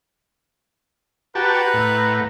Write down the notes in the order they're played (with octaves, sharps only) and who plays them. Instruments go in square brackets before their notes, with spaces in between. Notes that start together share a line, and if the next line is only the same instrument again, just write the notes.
[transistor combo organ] F#4 G4 A5 [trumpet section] B4 F#5 A#5
[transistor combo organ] A2